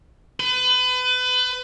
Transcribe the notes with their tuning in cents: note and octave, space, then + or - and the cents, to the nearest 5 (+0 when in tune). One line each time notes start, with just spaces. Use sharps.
B4 +30